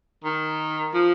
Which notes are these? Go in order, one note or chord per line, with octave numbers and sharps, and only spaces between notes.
D#3
F3